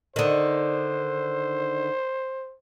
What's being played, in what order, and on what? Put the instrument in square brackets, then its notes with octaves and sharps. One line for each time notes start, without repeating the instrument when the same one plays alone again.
[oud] D3 D#3 [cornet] C5